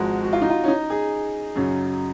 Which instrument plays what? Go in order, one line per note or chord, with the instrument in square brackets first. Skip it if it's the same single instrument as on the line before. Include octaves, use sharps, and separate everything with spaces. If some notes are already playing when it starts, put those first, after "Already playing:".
Already playing: [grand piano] G#1 G#2 F3 G#3 [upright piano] F#4
[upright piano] F#4
F4
D#4
F4
C#4
D#4
G#4
[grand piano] F#2 C#3 F#3